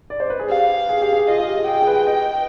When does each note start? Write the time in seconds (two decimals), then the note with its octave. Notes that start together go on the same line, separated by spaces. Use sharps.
0.10 D5
0.20 C5
0.30 B4
0.40 G#4
0.50 G4 F5
0.89 G#4
1.02 G4
1.13 G#4
1.28 F4 D#5
1.38 G#4
1.48 G4
1.67 G#4 G5
1.82 G#4
1.87 B4
2.07 D#5